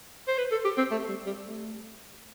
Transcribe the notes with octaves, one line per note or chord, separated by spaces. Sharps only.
C5
B4
A4
G4
C4
A3
G3
G3
A3